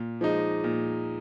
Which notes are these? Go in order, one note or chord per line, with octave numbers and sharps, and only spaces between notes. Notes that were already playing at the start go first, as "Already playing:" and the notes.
Already playing: A#2
F3 G#3 D#4
A#2